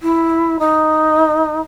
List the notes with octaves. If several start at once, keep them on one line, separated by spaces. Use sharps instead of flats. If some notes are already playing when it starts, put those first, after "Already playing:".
E4
D#4